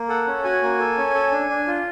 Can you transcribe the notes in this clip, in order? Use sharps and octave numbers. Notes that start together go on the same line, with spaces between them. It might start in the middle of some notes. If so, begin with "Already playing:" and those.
Already playing: A#3
A4 F#5
C#4
F#4 G#5
A#3
A4
C#4
A4
D4
D4
F4